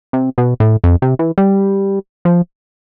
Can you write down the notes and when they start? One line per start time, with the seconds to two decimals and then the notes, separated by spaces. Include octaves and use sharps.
0.13 C3
0.38 B2
0.60 A2
0.84 F2
1.02 C3
1.19 E3
1.38 G3
2.25 F3